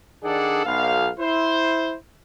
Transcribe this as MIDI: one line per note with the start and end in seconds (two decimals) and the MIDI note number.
0.24 0.63 51
0.24 0.63 62
0.24 0.63 68
0.24 0.63 69
0.24 0.63 74
0.24 0.63 78
0.65 1.10 35
0.65 1.10 77
1.20 1.95 64
1.20 1.95 72